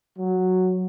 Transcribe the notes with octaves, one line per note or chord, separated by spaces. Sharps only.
F#3